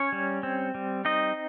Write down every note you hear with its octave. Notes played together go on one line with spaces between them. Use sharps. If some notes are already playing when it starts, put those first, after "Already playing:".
Already playing: C#4 C#5
G3
C4
G3
C4 D#4 D#5